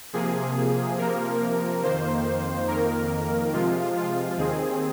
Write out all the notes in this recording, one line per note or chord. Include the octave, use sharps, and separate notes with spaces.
C3 F3 A#3 G#4
C3 F3 A#3 A#4
F2 D#3 A#3 C5
F2 D#3 A#3 A#4
C3 F3 G#3 F4
F4
D#2 D#3 C4 G#4